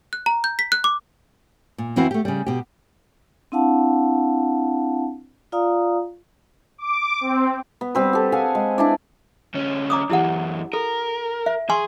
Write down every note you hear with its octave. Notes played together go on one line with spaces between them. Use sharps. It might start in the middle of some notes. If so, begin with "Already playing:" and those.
F#6
A#5
G6
B6
F#6
D6
A#2
F2 E3 C4 E4 F#4 F5
A3 G4
C#3 G3
B2 G4
C4 D4 E4 F5 F#5 A5
F4 D5 F5 A#5 D#6
D6
C4
B3
G3 C4 B4
G4 A4
G#4 F5 F#5 G#5
G#3
D4 E4 D5
D2 C#4
A#5 D6 D#6
F#2 E3 E4 G4 F#5
A4 A#4
E5
G#4 G#5 C6 C#6